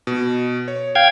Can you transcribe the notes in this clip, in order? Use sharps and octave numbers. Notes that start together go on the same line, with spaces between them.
B2
C#5
F5 G5 G#6